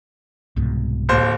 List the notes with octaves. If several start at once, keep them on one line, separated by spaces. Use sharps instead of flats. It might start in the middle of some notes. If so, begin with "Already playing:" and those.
C2 G#2 B2
D1 D#2 C5